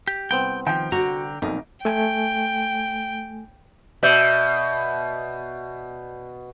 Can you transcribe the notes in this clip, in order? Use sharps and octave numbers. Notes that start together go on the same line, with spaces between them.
G4
C2 B3 C4 G5
D#3 F3 G5
D3 F#4 A#5
B1 F2 A#2 D#4
A3 G5 G#5
B2 D5 E5 G6